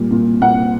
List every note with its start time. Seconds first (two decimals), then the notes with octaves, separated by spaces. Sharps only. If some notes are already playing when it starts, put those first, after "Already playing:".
Already playing: A#2 G3
0.11 A#2
0.41 A#2 F#5